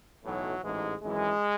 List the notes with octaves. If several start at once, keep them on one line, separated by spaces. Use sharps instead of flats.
B1 A2 E3 F#3
A1 G#2 E3 G#3
G#1 F#2 E3 G#3